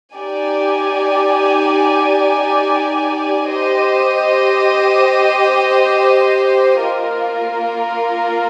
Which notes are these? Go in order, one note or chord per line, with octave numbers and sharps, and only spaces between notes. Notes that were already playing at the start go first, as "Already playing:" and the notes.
D#4 G4 D5 G#5
G4 C5 D#5
A#3 F4 A#4